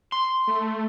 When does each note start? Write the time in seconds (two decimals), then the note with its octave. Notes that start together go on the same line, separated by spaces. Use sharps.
0.12 C6
0.47 A3